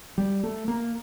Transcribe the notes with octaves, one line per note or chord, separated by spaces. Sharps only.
G3
A3
A#3